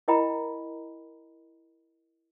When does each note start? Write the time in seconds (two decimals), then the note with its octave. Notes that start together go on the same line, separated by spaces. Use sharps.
0.08 E4 A#4 D#5 G5 A#5 B5